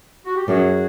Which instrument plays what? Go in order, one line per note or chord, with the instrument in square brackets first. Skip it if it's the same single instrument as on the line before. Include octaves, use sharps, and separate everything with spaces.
[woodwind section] F#4
G4
[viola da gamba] F#2 [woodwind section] F#4 G#4